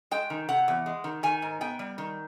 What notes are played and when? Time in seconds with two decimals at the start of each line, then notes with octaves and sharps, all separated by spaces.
0.11 G#3 G5
0.30 D#3
0.49 C3 F#5
0.68 E2
0.86 G#3
1.04 D#3
1.23 D#3 G#5
1.42 G#2
1.61 B3 G5
1.79 G3
1.98 D#3